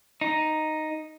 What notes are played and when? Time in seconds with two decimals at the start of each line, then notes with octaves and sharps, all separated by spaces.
0.21 D#4